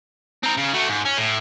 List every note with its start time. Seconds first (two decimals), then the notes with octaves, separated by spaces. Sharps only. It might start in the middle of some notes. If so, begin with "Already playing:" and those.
0.43 C4 A#4
0.57 C#3
0.73 A3 F#4
0.88 G#2
1.05 C#4
1.17 A2